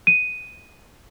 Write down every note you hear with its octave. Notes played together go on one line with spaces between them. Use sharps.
D#7